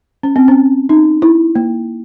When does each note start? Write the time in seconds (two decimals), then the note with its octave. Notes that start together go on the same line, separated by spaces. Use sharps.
0.23 C#4
0.36 C4
0.48 C#4
0.89 D#4
1.22 E4
1.55 A#3